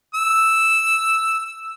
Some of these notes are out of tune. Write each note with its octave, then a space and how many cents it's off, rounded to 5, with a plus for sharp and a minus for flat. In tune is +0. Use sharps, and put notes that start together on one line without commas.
E6 +0